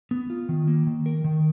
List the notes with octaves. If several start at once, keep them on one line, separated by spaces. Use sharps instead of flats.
B3
F4
D#3
A#3
D#3
A#4
D#3